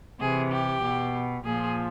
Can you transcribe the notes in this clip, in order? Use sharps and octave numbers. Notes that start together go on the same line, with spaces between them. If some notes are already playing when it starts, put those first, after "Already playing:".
C3 E3 G#4
G4
B2
A#2 F3 G#4